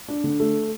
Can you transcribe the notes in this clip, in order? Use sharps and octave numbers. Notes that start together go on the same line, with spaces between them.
D4
D3
A3